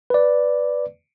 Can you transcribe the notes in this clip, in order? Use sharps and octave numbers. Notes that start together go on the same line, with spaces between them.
B4 D5